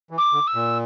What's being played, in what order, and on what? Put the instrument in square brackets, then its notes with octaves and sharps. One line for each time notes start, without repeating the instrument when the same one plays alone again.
[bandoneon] E3
[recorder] D6
[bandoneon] D3
[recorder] E6
[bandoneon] A#2